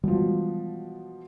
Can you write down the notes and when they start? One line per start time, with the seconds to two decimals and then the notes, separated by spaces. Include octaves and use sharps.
0.04 B2 E3 F3 G3 G#3